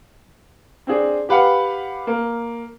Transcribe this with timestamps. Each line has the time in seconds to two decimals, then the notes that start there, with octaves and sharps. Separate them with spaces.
0.87 C4 D4 G#4
1.29 G4 B4 F5 F#5
2.07 A#3